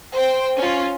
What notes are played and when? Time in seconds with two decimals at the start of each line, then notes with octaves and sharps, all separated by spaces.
0.15 C5 G5
0.57 C#4 F4